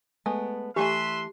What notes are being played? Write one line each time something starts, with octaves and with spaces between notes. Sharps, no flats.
G#3 A3 B3
E3 A3 G4 B4 E5 G#5 C6